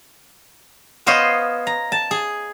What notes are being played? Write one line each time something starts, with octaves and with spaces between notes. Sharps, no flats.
B3 C5 C#5 D#5 F5
A#5
A5
G#4